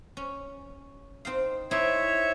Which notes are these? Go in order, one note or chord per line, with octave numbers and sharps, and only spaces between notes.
C#4
C4 D#4 F5
C4 D#4 E4 C#5 E5